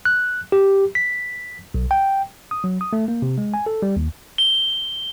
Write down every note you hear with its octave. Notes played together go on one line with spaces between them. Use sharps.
F#6
G4
B6
B1
G5
D#6
F#3
D#6
A3
A#3
C3
G#3
G#5
A4
G3
D#2
G7